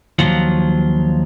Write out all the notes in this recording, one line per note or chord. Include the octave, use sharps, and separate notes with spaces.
D#2 F3 F#3 F4 F#5